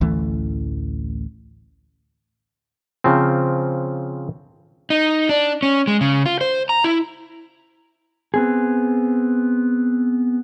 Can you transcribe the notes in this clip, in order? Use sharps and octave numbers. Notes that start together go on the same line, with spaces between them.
A1 D2 E3 A3
C#3 F3 C4
D#4
D4
C#4
G#3
C#3
F4
C5
A#5
E4
B3 C4 G#4